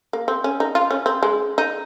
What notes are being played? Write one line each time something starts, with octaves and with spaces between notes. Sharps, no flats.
A#3
C4
C#4
D#4
F4
C#4
C4
G#3
D#4